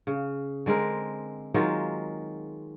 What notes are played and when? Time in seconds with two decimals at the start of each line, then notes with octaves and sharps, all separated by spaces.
0.07 C#3
0.66 D3 G#3 C4 A#4
1.54 D#3 F#3 G#3 F4